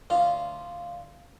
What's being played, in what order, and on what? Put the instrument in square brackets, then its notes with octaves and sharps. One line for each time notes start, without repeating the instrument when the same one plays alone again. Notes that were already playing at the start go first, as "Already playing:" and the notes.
[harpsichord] D2 F4 F5